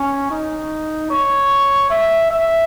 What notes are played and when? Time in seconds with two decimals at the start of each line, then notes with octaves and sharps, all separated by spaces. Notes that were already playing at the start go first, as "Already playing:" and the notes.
Already playing: C#4
0.31 D#4
1.10 C#5
1.90 E5
2.31 E5